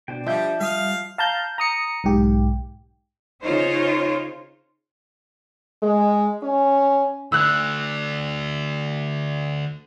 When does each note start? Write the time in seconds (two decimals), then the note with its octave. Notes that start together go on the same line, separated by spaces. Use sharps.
0.08 B2 D4 C5 G5
0.26 F3 G3 D#5 E5 G6
0.61 G3 F5 D#6 F6
1.18 F5 A5 A#5 G6
1.58 A#5 D#6 C#7
2.04 B1 G#2 G4
3.43 C#3 D#4 F4 C5 C#5
5.82 G#3
6.43 C#4
7.32 D2 D3 E6 F#6